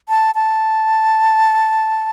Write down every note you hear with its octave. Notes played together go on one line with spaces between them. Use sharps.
A5
A5